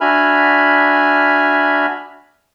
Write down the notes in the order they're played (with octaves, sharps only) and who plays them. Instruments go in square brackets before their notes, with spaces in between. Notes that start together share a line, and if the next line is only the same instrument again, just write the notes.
[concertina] D4 F#4 E5 G#5 B5 F6